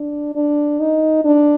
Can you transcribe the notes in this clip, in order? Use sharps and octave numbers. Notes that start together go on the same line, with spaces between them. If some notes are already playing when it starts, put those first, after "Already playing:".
Already playing: D4
D4
D#4
D4